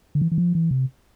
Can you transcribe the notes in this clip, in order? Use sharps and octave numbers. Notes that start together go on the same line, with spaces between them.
D3
E3
E3
F3
E3
C3